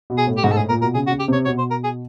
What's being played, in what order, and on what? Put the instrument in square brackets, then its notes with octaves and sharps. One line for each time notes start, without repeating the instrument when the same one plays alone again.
[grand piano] B2
[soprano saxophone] G#4
[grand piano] A2
[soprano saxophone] G4
[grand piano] G#2 [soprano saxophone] F#4
[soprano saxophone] A4
[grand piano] A2 [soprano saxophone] G#4
[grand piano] A#2 [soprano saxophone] A#4
[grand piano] B2 [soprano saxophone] A#4
[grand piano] C#3 [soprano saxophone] G#4
[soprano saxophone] F#4
[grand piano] C#3
[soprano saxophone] G4
[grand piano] C3 [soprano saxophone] C#5
[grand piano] B2 [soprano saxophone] C#5
[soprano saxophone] C5
A#4
G#4